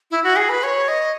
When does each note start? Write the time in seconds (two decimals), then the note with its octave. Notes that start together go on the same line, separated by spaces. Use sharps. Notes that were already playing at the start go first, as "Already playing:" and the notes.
0.11 E4
0.24 F#4
0.36 G#4
0.49 B4
0.63 C#5
0.88 D#5